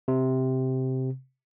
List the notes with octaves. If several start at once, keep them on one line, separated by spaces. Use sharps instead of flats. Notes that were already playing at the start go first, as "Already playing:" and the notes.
C3